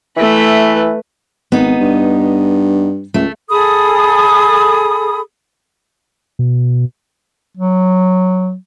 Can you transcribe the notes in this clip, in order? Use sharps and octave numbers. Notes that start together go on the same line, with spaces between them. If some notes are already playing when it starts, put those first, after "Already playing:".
E3 A3 B4
G#1 B3 D#4
G2
C#2 A3
G#4 A4 B5 D#6
B2
F#3